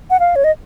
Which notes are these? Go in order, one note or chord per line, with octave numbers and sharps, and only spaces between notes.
F#5
F5
C#5
D#5